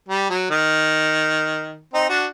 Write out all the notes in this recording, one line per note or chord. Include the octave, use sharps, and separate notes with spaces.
G3
F#3
D#3
C4 D#4
D4 F#4